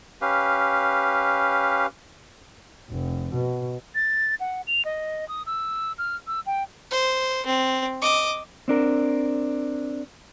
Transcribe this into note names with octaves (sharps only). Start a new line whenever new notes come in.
C#4 G4 B4 F5
F1
B2
A6
F#5
F7
D#5
D#6
E6
F6
E6
G5
C5
C4
D#5 D6
C4 D4 A#4